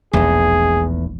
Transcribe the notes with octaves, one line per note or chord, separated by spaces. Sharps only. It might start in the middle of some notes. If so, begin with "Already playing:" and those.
E1 A#1 E2 A3 D#4 G#4